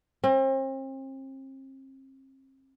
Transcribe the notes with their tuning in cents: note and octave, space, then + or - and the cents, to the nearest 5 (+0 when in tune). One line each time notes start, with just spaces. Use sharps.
C4 +40